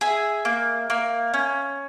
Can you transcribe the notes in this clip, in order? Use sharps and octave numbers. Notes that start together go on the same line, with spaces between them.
G#4 E5
A#3
A#3
C#4